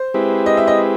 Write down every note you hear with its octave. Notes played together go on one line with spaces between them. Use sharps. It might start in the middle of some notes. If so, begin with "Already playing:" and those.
Already playing: C5
G#3 C4 E4 G4 B4
D#5
E5
D#5